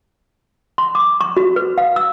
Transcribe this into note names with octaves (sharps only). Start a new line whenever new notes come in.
C6
D6
C#6
F#4
B4
F5
E6